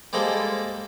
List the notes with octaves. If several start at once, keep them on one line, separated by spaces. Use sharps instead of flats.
G3 G#3 A#3 A4 C5